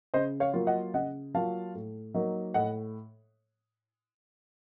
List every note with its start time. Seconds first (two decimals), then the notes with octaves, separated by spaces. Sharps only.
0.14 C#3 C5 D#5
0.40 C#5 F5
0.54 F#3 A#3 F4
0.67 D#5 F#5
0.94 C#3 D#5 F#5
1.34 F#3 A#3 F4 F5 A5
1.75 A2
2.14 F#3 A#3 D#4
2.54 A2 D#5 F#5